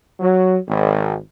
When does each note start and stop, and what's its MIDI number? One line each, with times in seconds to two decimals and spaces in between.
0.20 0.57 54
0.68 1.16 32